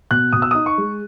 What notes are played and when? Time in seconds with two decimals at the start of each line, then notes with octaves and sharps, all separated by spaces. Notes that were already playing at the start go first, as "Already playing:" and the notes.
0.11 B2 F#6
0.33 B2 D#6
0.42 E6
0.51 D#4 D#6
0.66 C#6
0.78 G#3